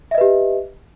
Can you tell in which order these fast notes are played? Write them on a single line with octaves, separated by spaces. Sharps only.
E5 D#5 B4 G4